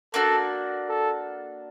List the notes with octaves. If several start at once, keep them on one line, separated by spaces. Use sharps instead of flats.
A#3 D4 F#4 A4
A4